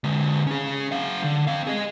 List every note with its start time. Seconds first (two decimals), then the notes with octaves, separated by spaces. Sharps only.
0.04 D3 G#3
0.47 C#4 G#4
0.92 F#3 F5
1.24 D3
1.47 C4 F5
1.67 G#4 D#5